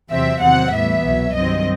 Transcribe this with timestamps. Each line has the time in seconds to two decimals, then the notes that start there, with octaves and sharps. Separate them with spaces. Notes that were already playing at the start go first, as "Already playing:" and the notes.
0.11 E2 C3 F#3 C4 E5
0.42 E2 C3 D#3 F#3 C4 F#5
0.74 A2 E3 G3 B3 E5
1.05 C2 B2 F#3
1.36 G2 D#3 F#3 C4 D#5